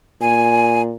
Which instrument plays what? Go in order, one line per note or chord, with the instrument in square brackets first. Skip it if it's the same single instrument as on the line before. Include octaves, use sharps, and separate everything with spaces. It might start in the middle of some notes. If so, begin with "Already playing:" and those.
[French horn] A#2 [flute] G#5